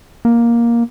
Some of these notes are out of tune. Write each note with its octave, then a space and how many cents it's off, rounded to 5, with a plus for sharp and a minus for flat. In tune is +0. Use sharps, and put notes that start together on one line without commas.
A#3 +10